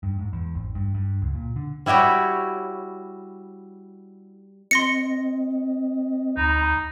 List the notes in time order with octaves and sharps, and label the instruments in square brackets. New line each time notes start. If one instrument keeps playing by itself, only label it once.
[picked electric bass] G2
G#2
E2
G#1
G2
G2
C#2
A#2
D3
[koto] G3 E4 F#4 G4 C#5
[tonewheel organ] C4 D#5 [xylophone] C6 A#6 C#7
[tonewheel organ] D2 A#5 B5 [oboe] D#4